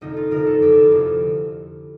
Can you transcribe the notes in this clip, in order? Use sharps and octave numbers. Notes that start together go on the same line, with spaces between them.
F1 F2 D3 D#4
F4
F1 F2 D3 A#4
A4
F1 F2 D3 G4
E4
F4
F1 F2 D3